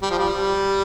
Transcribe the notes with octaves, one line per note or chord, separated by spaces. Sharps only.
G3
F3
G3